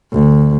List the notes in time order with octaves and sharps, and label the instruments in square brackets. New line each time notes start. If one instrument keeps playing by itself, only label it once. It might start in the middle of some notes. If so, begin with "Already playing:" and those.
[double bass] D2